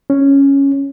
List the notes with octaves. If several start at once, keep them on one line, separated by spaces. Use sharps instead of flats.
C#4